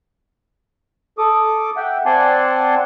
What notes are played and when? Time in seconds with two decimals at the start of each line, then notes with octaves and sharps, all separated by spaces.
1.18 A4 D6 D#6
1.77 E5 F#5 G5
2.06 C4 D5 F#5 G#5 A5 C6